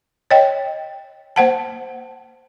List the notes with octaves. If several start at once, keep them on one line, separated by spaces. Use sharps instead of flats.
C#5 D#5 G5
A#3 C5 F#5 A5